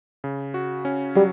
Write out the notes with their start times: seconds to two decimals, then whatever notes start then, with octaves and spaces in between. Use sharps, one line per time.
0.24 C#3
0.54 F#4
0.85 C#4
1.15 F#3 G3